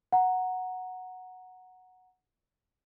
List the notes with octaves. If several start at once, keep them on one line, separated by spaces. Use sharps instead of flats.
F#5 A#5